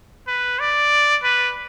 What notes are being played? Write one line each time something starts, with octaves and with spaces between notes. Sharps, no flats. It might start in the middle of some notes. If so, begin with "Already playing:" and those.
B4
D5
B4